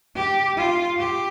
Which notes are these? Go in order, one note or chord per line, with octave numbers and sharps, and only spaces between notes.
G4
F4
G4